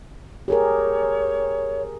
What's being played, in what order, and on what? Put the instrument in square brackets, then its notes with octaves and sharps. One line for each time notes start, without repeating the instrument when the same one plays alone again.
[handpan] G4 G#4 A#4 [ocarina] C#5